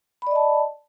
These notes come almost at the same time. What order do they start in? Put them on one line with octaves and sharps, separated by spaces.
B5 D5 D#5 A5